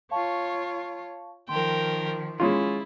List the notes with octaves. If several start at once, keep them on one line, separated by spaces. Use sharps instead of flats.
F4 C#5 F5 A5 C#6
D#3 F3 A#4 G5 C6
G#3 C#4 E4 F4